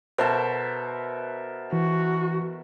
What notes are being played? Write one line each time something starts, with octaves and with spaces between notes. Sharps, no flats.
B2 A4 A#4 C5 E5
E3 F#4